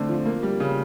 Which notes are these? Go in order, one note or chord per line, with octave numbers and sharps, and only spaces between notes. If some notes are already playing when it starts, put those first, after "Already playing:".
Already playing: D3 A3 C4
F3
A#3
G3
C#3